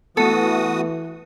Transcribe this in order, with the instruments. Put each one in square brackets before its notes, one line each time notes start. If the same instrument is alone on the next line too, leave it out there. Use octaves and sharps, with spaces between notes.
[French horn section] E3 [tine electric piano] A3 B3 [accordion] F#4 D#6 [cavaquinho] A4